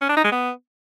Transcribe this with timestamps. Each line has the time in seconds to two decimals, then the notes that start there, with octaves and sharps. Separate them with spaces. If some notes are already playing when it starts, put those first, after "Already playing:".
0.02 C#4
0.09 D4
0.17 D#4
0.24 G#3
0.32 B3